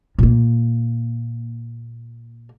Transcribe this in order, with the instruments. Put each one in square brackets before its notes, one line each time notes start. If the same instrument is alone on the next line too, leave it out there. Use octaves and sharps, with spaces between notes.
[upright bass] A#2 A#3